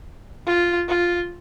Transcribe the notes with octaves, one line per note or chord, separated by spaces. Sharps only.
F4
F4